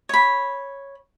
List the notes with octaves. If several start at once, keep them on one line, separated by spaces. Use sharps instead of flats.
C#5 B5